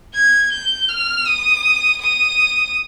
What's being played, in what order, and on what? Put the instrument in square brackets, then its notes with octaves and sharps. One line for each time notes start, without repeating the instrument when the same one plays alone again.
[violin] G#6
G6
F6
D#6
D#6